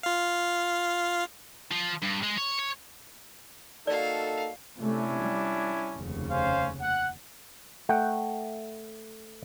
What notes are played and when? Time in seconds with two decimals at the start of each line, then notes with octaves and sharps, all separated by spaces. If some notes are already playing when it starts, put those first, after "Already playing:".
0.03 F4 F5
1.71 F3
2.02 G2
2.22 G#3
2.37 C#5
2.59 C#5
3.87 A#3 D#4 F#4 A4 D5 F5
4.79 C3 A3 C#4 D4 E4
5.20 G3
5.96 F1 D#2 C#3
6.31 C#4 C5 F5
6.82 F#5
7.89 A3 F#5 G5